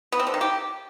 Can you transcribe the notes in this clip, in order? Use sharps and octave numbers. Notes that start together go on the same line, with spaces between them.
B3
C4
D3
D#3
G4